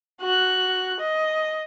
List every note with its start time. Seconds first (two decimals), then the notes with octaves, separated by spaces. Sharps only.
0.21 F#4 F#6
1.00 D#5